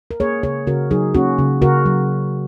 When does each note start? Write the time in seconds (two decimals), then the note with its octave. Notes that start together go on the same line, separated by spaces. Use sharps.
0.11 A#4
0.20 A#3 G#4 C#5
0.43 C#3 G#4 C#5
0.67 C#3 F#4 A#4
0.91 F#3 D#4 G#4
1.14 A#3 C#4 F#4
1.38 C#3
1.62 C#3 F#4 A#4
1.86 F#3